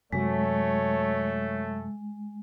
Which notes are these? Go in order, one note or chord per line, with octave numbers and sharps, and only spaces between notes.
F#2 C3 F#3 G#3 A3 C#5